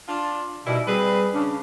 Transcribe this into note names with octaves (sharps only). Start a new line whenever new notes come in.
D4 F4
B2 D#3 G3 E4
G3 C4 G#4 B4
C#3 D4